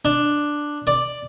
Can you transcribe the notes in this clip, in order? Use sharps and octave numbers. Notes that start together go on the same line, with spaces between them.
D4
D5